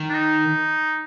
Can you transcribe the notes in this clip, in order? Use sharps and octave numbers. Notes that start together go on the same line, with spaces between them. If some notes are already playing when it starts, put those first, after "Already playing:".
Already playing: D#3
D4
D#4